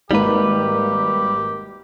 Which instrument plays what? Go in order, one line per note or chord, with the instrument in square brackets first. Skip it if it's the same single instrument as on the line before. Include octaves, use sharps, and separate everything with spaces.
[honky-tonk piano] G#1 A#3 [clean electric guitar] G3 B4 [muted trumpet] G4